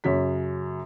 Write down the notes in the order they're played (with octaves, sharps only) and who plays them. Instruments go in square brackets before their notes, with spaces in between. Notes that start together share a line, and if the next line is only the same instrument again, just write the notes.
[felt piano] F#2 C#3 F#3 C#5 B6